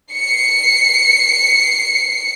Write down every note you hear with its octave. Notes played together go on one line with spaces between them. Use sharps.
C7 C#7